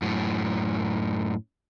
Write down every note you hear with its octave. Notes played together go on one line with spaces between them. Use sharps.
F#2 A2